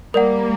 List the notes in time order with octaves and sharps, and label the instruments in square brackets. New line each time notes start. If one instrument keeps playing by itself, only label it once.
[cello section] G3 A#3 [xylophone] A#4 D5 F#5